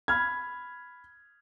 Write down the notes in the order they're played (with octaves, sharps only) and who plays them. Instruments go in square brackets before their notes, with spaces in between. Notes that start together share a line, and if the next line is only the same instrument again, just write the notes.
[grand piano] B5 F6 G#6